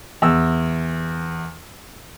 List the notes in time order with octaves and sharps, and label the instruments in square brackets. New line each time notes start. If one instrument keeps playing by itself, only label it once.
[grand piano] E2 E6